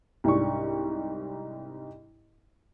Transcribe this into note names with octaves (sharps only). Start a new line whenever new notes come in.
C2 G#2 D4 C#6